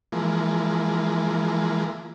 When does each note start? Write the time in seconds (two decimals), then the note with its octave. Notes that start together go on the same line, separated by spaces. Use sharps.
0.12 E3 F3 G#3 A#3